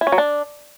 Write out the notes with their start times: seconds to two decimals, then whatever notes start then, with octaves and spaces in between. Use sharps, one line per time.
0.01 E4
0.07 C#4
0.12 F#3
0.18 D4